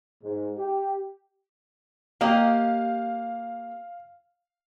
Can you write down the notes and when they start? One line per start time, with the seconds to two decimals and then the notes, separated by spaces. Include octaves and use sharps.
0.23 G#2
0.58 G4
2.21 A#3 G4 D#5 F5